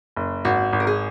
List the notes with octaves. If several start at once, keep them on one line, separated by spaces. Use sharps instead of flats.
F#1
G#1 F#4
G#1
A#4
G#4